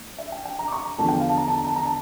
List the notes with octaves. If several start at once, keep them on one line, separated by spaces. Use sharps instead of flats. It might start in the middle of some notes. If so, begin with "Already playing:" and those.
Already playing: A2 A3
E5
G5
G5
A#5
D6
C#6
A#5
E2 D3 F3 A3 A5
G5
F5
A5
A#5
A5
A#5
A5
A#5
A5